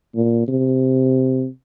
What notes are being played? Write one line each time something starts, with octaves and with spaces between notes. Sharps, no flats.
A#2
C3